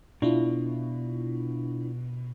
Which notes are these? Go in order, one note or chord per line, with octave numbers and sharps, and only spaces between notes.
B2 D4 E4 F4